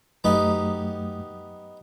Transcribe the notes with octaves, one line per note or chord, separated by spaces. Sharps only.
F#2 F#3 A3 B3 D#4 G4